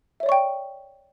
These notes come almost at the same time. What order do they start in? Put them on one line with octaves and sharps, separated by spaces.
E5 C#5 D5 C#6 G5